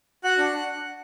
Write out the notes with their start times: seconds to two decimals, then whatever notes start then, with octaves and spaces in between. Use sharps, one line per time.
0.24 F#4 F#5 F#6
0.38 D4